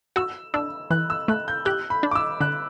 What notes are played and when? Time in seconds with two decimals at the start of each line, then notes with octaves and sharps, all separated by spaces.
0.16 F#4 E6
0.54 D4 E6
0.90 E3 F#6
1.10 E6
1.28 A3 F#6
1.48 G6
1.65 G4 F#6
1.90 B5
2.03 D4
2.11 D6
2.15 E6
2.40 D3 F#6